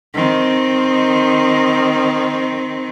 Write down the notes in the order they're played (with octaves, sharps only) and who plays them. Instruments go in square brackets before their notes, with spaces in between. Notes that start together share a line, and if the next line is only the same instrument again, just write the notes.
[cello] D#3 C4